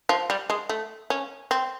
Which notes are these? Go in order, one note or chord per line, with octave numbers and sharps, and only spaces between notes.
F3
G3
G#3
A3
C#4
C4